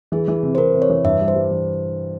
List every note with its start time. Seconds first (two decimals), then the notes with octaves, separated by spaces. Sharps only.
0.12 E3 G#4
0.28 E3
0.43 C3
0.55 C5
0.58 C3 A#4
0.74 C3
0.82 C#5
0.90 E3
1.04 G2 E5
1.20 G3
1.28 C5
1.35 G3
1.51 E3